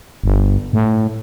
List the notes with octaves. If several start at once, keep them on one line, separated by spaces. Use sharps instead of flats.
G1
A2